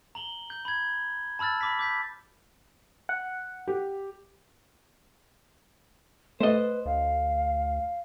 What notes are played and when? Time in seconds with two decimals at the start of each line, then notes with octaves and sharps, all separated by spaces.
0.15 A#5 F#7 G7
0.50 G6
0.65 B5 G#6
1.39 A5 B5 E6 F6 A6
1.61 B5 D6 B6
1.79 D6 G6 B6
3.09 F#5
3.67 G4
6.40 A3 B4 C5 D#5
6.86 D2 F5